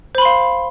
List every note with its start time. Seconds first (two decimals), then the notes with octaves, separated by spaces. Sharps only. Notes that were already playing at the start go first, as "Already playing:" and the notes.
0.15 C5
0.18 B5
0.22 C6
0.25 F5